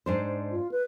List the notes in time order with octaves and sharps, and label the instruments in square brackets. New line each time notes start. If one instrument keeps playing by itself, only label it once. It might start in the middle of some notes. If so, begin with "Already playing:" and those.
[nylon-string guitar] G#2 D4 C5
[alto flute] F4
B4